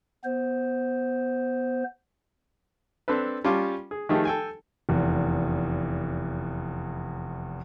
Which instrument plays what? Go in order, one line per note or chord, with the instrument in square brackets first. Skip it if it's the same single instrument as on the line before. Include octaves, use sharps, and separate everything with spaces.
[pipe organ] B3 C5
[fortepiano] C4 D4 A4 B4
G3 C#4 F4 A5 D6
G#4
D#3 F3 A3 D#4 G4 G#4
A4 G5 G#5
[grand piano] F1 E2